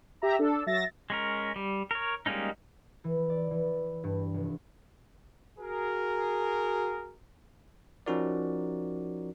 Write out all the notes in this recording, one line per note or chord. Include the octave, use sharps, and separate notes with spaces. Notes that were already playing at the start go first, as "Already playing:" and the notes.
G4 E5 A#5
D4 A4
F#3 E5 A6 A#6
G#3 C#4 A#4
G3
A#4 C#5
G3 G#3 A#3 C#4 D#4
E3
D5
E3
G2
F1
F#4 G#4 A#4
F3 C#4 D#4 F#4 A#4 D5